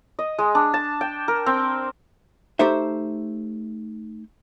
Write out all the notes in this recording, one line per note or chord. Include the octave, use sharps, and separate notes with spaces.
D#5
G#3
D4
A5
G5
A#4
C4
A3 D#4 G4 A4 C5 E5